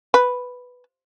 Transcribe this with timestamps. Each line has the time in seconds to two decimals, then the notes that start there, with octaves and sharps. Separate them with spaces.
0.14 B4